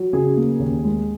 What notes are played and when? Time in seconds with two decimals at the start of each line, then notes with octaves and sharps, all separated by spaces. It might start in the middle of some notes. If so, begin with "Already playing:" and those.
Already playing: F#3
0.13 C#3 G#4
0.37 A#3
0.60 D#2
0.84 G#3